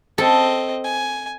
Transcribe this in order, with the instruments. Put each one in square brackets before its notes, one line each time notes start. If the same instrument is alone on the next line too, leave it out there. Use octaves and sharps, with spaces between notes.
[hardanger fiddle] C4 D#5 [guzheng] A4
[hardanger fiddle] G#5